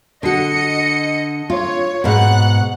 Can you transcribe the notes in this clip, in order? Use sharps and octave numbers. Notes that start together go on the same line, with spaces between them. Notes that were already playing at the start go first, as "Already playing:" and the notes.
D3 F#4 D#5 C#7
F4 C#5
G#2 B2 F#5 F#6